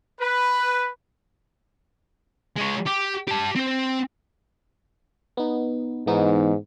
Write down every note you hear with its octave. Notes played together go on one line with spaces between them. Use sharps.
B4
G#3 C#5
G4
G4 A5
C4 C5
B3 D#4
G#2 E3 B3 D#4